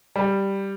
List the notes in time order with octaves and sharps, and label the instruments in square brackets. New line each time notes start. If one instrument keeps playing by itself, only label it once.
[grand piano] G3